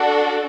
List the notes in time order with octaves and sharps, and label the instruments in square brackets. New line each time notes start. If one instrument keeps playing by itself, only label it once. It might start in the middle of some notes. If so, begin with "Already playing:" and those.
Already playing: [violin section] D4 F#4 A4